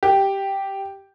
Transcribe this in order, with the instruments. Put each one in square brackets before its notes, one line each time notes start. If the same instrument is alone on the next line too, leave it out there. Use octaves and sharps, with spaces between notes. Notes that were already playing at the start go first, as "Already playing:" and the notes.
[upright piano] G4